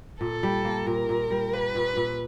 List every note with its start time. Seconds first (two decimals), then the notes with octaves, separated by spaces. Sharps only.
0.20 A#2 A4
0.43 G3
0.65 A#3
0.86 A#2 A#4
1.09 A#2
1.31 G3
1.53 A#3 B4
1.75 A#2
1.96 A#2